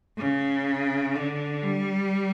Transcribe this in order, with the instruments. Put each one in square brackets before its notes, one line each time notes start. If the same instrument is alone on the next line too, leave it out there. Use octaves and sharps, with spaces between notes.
[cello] C#3
D3
G3